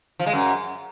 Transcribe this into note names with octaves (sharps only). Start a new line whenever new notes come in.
F3
G#3
F#2